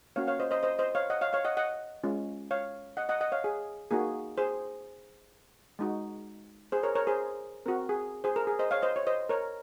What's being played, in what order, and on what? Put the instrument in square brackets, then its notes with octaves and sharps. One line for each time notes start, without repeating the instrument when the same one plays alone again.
[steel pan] A#3 C#4 F#4 C#5 F5
C#5 F5
C5 D#5
C5 D#5
C5 D#5
C5 D#5
C#5 F5
D#5 F#5
C#5 F5
C#5 F5
D#5 F#5
D#5 F#5
G#3 C#4 F4
C#5 F5
D#5 F#5
D#5 F#5
D#5 F#5
C#5 F5
G#4
A#3 D#4 F#4 G#4
G#4 C5
G#3 D#4 F#4
G#4 C5
A#4 C#5
A#4 C#5
G#4 C5
C4 F#4 A#4
G#4
G#4 C5
A#4
G#4
C5 D#5
C#5 F5
C5 D#5
C#5
C5 D#5
A#4 C#5